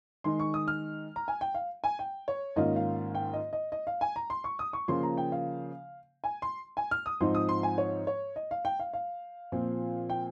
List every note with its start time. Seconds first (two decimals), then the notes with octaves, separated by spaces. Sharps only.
0.24 D#3 G#3 D#4 C6
0.40 C#6
0.54 D#6
0.68 F6
1.16 A#5
1.28 G#5
1.41 G5
1.55 F5
1.84 G#5
1.99 G5
2.28 C#5
2.56 G#2 D#3 A#3 C#4 F4 D#5
2.76 F5
3.15 G5
3.33 D#5
3.53 D#5
3.72 D#5
3.87 F5
4.01 G#5
4.16 A#5
4.30 C6
4.44 C#6
4.59 D#6
4.73 C#6
4.88 C#3 F3 A#3 C6
5.03 A#5
5.18 G5
5.32 F5
6.24 G#5
6.42 C6
6.77 G#5
6.91 F6
7.06 D#6
7.21 G#2 F3 C4 D#4 C6
7.35 D#6
7.49 C6
7.63 G#5
7.78 C#5
8.07 C#5
8.36 D#5
8.51 F5
8.65 G5
8.80 F5
8.94 F5
9.52 A#2 F3 C4
10.10 G5